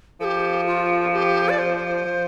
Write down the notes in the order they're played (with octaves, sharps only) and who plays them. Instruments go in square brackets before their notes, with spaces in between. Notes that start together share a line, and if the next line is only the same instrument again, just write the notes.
[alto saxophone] F3 [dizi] A4
[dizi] G4
F4
G4
D5
C5
[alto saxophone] F3